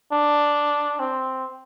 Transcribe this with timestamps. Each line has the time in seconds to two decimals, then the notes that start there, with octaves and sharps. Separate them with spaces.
0.12 D4
0.99 C4